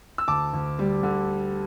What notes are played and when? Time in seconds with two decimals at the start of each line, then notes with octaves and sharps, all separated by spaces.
0.18 E6
0.28 D2 A5 D6
0.53 D2
0.79 G3
1.03 D3